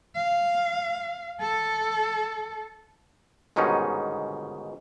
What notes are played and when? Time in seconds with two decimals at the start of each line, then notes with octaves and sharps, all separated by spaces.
0.16 F5
1.41 A4
3.56 G1 G#2 B2 D#3 C#4 D#4